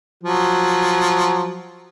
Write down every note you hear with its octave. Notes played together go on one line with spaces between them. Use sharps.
F3 F#3